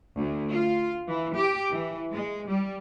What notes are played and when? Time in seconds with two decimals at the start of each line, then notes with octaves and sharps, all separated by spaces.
0.17 D2
0.52 F4
1.08 E3
1.37 G4
1.71 E3
2.11 G#3
2.47 G3